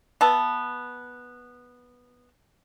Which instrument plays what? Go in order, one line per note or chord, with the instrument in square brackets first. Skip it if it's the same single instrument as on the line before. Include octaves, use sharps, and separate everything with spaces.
[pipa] B3 E5 A5